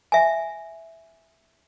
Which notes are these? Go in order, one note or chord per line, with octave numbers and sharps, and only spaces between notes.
E5 G#5